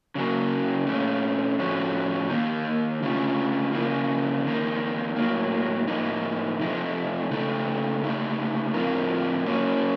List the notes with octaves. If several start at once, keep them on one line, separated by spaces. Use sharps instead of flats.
C#3 F#3 A#3
A#2 A3 C#4
A2 F3 A3 C#4 F#4
D#3 A#3 D#4
C#3 A3 C#4 F4
C#3 F3 A#3
F2 D#3 A#3
A2 F#3 A#3
A2 F3 A#3 D#4
C3 F3 A3 D#4
C#3 A3 D#4 A4
C#3 A3 D#4
A2 F3 C4 F4 A#4
F#3 A#3 C#4